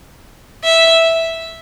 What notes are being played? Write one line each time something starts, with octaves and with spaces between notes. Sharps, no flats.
E5